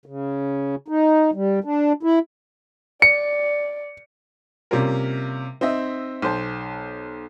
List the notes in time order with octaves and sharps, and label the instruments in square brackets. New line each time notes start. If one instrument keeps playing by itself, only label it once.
[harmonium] C#3
D#4
G3
D4
E4
[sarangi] D5 [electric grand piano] C#7
[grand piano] C3 G3 A#3 C#4 F4 A#4
C4 D#4 D#5 E5
B1 C5 A5